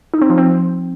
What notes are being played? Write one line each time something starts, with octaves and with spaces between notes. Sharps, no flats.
D#4
C4
F3
C4